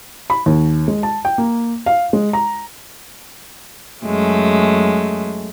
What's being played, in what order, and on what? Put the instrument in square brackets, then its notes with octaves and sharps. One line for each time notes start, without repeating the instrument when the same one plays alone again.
[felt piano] B5
D#2
G#3
A5
G5
A#3
F5
G#3
A#5
[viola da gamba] F#2 G#3 A3